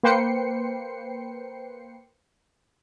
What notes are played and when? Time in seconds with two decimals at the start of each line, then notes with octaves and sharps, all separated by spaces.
0.03 A#3 B4 C5 G5 C7 C#7